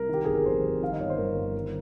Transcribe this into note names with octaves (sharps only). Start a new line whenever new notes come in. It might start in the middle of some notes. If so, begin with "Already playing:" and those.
Already playing: C2 A#4
D#3 G4
G1 G#4
A#4
F2 C5
G1
D#3 F5
D#5
G1 C#5
C5
G2 A#4
G1
D#3